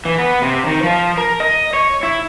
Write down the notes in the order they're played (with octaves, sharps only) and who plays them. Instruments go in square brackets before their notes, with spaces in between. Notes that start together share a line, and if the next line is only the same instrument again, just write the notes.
[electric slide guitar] E3
B3
C3
D#3
F3
A#4
D#5
C#5
E4